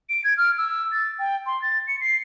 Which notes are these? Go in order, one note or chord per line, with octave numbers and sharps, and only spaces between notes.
D7
G#6
F6
E6
A6
G5
C6
A6
C#7
C7